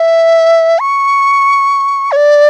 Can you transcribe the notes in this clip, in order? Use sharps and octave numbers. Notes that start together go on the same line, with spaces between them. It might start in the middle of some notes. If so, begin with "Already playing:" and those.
Already playing: E5
C#6
C#5
D5